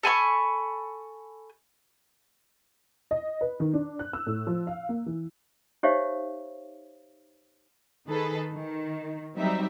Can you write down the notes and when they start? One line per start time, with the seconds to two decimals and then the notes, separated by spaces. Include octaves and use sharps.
0.03 A4 G#5 B5 C#6
3.11 D#5
3.41 B4
3.60 D#3
3.74 D4
3.99 F#6
4.13 E6
4.27 A2
4.47 F3
4.67 F5
4.89 A#3
5.06 E3
5.83 D#4 G4 C5 C#5 E5 F5
8.07 D#3 D#4 G#4 A4 B4
8.54 D#3
9.37 F#3 G3 C4 D#4 E5